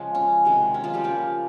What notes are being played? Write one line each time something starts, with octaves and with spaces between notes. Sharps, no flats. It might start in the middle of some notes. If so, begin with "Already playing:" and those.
Already playing: C#3 F3 G#3
C#4
C3 D#3 G#3
C#4
F3 F4
G3 G4
C#3 F3 A#3